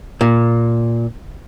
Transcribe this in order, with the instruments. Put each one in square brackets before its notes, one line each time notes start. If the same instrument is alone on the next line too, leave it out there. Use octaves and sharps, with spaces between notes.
[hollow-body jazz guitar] A#2